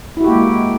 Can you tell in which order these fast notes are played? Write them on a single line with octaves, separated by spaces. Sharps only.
E4 F#4 G4 A#3 G#3